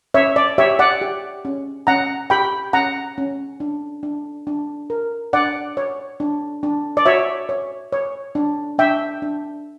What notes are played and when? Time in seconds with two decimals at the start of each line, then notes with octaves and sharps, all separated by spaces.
0.14 C#4 C#5 E5
0.36 D5
0.58 G4 C#5 E5
0.79 D5 F#5
1.02 G4
1.45 C#4
1.87 C#4 F#5 A#5
2.30 G4 G5 B5
2.73 C#4 F#5 A#5
3.18 C#4
3.60 D4
4.03 D4
4.47 D4
4.90 A#4
5.33 D4 D5 F#5
5.77 C#5
6.20 D4
6.63 D4
6.97 D5
7.06 F#4 C#5 E5
7.49 C#5
7.93 C#5
8.35 D4
8.78 D4 E5 G5
9.22 D4